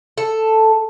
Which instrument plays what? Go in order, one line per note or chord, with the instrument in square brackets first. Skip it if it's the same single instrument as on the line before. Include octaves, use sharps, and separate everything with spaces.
[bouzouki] A4